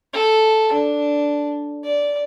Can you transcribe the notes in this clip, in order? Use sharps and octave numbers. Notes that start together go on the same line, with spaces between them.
A4
D4
D5